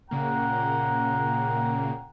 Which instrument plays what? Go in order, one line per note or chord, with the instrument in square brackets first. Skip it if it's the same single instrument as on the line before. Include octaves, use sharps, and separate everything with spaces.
[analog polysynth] A#2 C#3 A#3 [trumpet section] F#5 G5 A#5